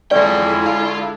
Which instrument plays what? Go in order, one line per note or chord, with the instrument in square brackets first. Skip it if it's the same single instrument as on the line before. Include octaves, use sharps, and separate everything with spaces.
[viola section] D3 G#3 E4 [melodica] C#4 [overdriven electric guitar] F4 G5 [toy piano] D5
[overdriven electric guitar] F4 F5